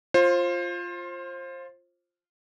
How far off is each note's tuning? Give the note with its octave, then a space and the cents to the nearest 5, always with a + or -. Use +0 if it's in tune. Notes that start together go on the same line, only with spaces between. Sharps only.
F4 +0 C5 +25